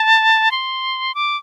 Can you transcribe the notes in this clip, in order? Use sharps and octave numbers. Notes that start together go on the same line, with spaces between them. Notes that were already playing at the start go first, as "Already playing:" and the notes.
Already playing: A5
C6
D6